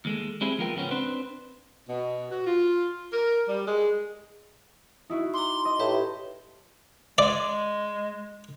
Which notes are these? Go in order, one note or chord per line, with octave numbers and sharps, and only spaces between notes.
D#2 G#3 A3
G3 G#3 C4 E4 G#4
D#2 F3 B3 F4 A#4 G5
G#2 C#3 F3 B3 C#4
C4 D4 B4 C5
B2
F#4
F4
A#4
G3
G#3
D#4 E4 F#4
A#5 C6 D6
D#5
A2 G4 B4 E5
G#3 D5